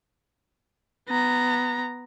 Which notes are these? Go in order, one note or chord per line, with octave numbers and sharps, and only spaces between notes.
B3 A#5